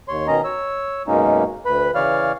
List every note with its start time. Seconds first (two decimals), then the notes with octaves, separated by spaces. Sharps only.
0.08 D#2 C#5 C6
0.27 B2 D#3 C#4 D#5 A#5
0.44 C#5 E6
1.07 F#2 B2 G#3 A#3 C#4 D#4
1.66 D2 B4 B5
1.95 C#3 E3 C#5 D5 F5 F6